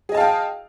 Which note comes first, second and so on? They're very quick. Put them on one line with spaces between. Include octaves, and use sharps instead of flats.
G#4 D#5 A5 F5 G5